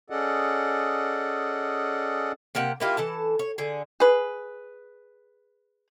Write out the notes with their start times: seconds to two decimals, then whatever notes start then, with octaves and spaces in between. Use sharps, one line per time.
0.10 C#4 G#4 A4 D5 D#5 F#5
2.55 C3 A#3 G4 F#5
2.80 A#3 E4 F4 G4
2.97 E3 A4 A5
3.39 C#5
3.58 D3 G#4
4.00 G#4 B4